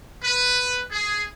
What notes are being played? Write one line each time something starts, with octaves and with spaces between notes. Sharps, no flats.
B4
G#4